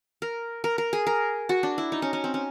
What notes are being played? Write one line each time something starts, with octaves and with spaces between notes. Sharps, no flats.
A#4
A#4
A#4
G#4
A#4
F#4
D4
E4
D#4
C#4
C#4
C4
C#4